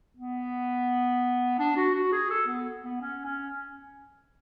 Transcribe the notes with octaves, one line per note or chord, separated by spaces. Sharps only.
B3
D4
F#4
F#4
G#4
A4
B3
B3
C#4
C#4